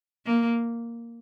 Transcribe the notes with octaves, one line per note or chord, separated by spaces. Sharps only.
A#3